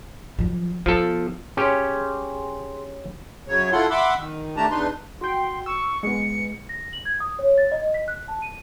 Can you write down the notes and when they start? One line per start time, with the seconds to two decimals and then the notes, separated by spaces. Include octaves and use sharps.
0.39 F3 F#3
0.86 F3 B3 A4
1.57 C#4 G4 G#4 C#5 C6
3.48 F#2 C#3 F#3 C#5
3.72 E4 F4 A4 F#5 C6
3.90 E5 F#5 B5 C6 D6 E6
4.16 D#3
4.57 D#3 A3 D4 G4 A5 A#5
4.71 E2 D4 D#4 B4 C6
5.21 F#4 G5 C6
5.66 C#6 E6
6.03 G#3 B3 C#7
6.69 A#6
6.93 F#7
7.05 G#6
7.20 D#6
7.39 C#5
7.58 A6
7.72 D#5
7.94 B6
8.08 F#6
8.28 A5
8.42 D#7